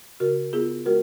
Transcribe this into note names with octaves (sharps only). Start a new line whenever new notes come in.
C#3 F#4 A#4
B3 F4 G#4
G#3 F#4 A#4